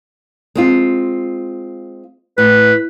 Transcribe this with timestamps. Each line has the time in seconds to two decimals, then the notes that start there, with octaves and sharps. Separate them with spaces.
0.55 G#3 C4 F4
2.38 A2 B4